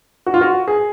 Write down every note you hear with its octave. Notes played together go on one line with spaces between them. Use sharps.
F#4
F4
F#4
G#4